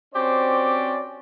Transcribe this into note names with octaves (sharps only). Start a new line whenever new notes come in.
C4 C#4 F#4 G4 C5 D5